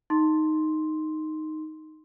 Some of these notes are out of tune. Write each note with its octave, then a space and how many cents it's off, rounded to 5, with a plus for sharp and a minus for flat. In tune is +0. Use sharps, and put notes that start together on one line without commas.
D#4 +0 C6 +0